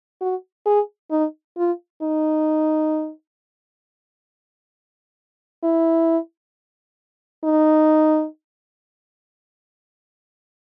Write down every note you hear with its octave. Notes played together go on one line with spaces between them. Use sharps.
F#4
G#4
D#4
F4
D#4
E4
D#4